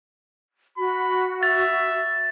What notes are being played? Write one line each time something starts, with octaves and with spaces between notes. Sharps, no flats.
F#4 B5
E5 A6